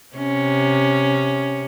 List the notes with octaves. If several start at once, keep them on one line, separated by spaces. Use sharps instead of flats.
C3 C#4